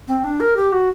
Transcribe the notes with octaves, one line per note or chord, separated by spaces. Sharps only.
C4
D4
A#4
G4
F#4